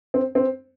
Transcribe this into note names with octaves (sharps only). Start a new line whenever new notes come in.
C4
C4